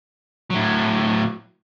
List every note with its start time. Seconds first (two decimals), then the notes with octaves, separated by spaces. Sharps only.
0.50 A2 F#3